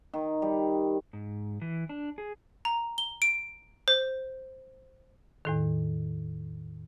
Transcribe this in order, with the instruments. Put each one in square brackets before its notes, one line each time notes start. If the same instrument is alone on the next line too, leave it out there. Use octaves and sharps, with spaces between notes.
[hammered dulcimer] D#3
G3
[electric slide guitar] G#2
E3
D4
G#4
[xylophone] A#5
G7
D7
C5
[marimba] E2 A2 D#3